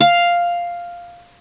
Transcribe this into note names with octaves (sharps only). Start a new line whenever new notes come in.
F5